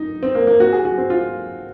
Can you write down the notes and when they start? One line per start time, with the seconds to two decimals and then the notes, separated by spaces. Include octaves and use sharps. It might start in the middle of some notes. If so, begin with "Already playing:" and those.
Already playing: D#4
0.23 C4
0.35 A#3
0.47 A#3
0.60 F#4
0.73 G#4
0.85 F#4
0.98 C4
1.10 F4